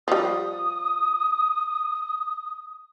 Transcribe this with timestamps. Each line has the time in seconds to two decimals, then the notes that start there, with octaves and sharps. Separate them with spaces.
0.08 F3 G3 D#6